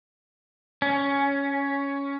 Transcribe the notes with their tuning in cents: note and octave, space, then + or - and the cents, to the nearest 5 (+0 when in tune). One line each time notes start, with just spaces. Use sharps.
C#4 +10